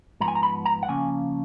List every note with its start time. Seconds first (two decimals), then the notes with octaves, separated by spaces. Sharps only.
0.20 G#2 F3 B3 A#5
0.28 G#5
0.35 A#5
0.43 B5
0.66 A#5
0.83 F#5
0.89 C#3 F3 A#3 C#4 G#5